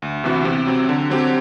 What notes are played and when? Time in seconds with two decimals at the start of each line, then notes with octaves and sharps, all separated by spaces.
0.02 D2
0.24 C3 E3 B3 F#4
0.45 C3
0.67 F#3 C4
0.89 D3
1.10 F#3 C4 G4